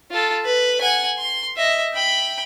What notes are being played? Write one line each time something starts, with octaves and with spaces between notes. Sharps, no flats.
F4 A4
B4
F#5 G#5
C6
D#5 E5
G5 B5